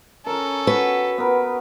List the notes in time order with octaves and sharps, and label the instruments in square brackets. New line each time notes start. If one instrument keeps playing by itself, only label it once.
[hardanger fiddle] C#4 A4 [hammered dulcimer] A#4 A#5
[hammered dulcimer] F#4 B5 [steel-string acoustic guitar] B4
[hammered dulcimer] B3 A#4